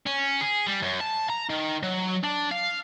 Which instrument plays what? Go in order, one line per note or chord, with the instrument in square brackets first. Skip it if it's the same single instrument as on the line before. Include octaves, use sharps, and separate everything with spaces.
[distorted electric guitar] C#4
G#4
G3
F#2
A5
A#5
D#3
F#3
D4
F5